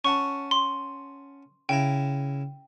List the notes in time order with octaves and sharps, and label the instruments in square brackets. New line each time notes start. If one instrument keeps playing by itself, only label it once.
[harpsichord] C#4 F#5 A5 [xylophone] C#6
[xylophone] C6
[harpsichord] C#3 E4 A#5 [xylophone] G5